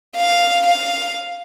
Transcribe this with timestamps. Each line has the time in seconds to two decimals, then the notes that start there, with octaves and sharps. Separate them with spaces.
0.17 F5
0.67 F5